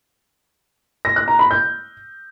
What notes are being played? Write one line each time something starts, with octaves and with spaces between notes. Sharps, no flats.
A#6
F#6
A#5
B5
G6